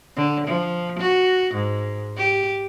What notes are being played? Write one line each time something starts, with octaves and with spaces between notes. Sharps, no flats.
D3
F3
F#4
G#2
G4